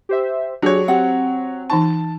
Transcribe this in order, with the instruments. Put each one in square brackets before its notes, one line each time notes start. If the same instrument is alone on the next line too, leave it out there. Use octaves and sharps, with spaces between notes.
[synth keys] G4 C5 E5
[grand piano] F#3 C#5 [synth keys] D4 G4 G#4
[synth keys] C4 [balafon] G4 [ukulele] F#5
[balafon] E3 D#4 C#6 [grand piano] A5